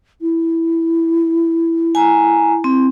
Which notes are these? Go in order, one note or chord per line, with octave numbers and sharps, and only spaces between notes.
E4
G#5 A#5
C4